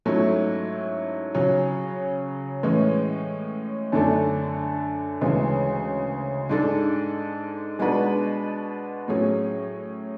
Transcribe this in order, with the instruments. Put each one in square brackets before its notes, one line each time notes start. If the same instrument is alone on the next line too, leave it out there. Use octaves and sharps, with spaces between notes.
[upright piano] G#2 F#3 A3 C#4 E4
C#3 F#3 C#4
A2 E3 G#3 C#4
F#2 D3 A3 D4 A4
D2 C#3 E3 G#3
G#2 G#3 D4 A4
B2 G#3 D4 F#4 B4
A2 F#3 C#4 G#4